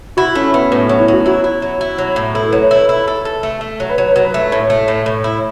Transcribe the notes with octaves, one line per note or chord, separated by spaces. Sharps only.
E4 F#4
A3 C#4
A3 B3
A2 B3
F#3 C#4
E4
F#3 F#4
E4 F#4
E4
F#3
E4
F#3
A2
E4 A4
F#3 B4
C#5
E4 B4
E4 E5
A4
A4
A3
A3
F#3
B4
F#3 C#5
F#3 B4
B4
A3 E5
A2 C#5
A3
A2
A2
E4